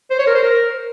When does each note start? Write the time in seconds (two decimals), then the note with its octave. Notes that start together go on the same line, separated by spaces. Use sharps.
0.11 C5
0.19 C#5
0.27 A#4
0.35 C5
0.43 A#4